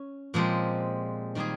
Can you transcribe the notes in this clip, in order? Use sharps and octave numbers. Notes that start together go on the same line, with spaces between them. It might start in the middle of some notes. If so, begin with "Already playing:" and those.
Already playing: C#4
A#2 F3 G#3 C4 G4
D#3 G3 A#3 D#4 G#4